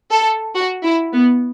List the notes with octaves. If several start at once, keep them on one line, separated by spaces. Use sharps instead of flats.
A4
F#4
E4
B3